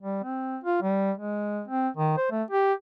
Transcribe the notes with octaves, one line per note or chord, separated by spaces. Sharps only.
G3
C4
F4
G3
G#3
C4
D#3
C5
A3
G4